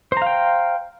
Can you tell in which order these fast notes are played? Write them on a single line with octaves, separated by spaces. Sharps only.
C5 A#5 F5 G5